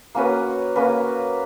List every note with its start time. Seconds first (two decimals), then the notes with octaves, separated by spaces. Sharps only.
0.15 A#3 C#4 F#4 B4
0.75 A#3 C#4 F#4 B4